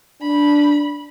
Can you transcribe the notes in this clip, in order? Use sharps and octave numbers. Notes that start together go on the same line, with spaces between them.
D4 B5